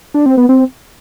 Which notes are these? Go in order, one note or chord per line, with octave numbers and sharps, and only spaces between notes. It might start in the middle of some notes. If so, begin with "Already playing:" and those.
D4
C4
B3
C4